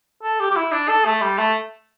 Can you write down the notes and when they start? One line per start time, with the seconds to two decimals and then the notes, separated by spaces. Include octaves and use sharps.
0.23 A4
0.40 G4
0.50 G4
0.56 E4
0.72 D4
0.88 A4
1.05 A3
1.21 G3
1.38 A3